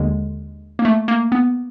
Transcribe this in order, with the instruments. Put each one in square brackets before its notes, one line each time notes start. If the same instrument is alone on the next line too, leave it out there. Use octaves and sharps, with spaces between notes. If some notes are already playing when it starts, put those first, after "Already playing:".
Already playing: [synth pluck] D#2 D3 G#3
A#3
A3
A#3
B3